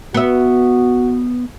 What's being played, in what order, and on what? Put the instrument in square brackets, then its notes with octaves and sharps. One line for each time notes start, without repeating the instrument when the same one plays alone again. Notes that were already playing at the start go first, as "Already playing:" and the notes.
[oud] B3 E5 [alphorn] F#4